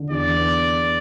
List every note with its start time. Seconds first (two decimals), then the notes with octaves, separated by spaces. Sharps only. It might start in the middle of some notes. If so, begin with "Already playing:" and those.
Already playing: D3
0.10 E2 D5
0.37 B3